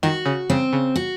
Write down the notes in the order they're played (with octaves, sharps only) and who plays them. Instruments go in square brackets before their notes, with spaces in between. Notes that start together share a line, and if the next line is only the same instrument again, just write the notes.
[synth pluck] D#3 [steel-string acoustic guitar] F#4
[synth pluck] C#3
[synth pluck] C#3 [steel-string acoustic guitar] C4
[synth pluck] C#3
[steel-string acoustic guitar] F#4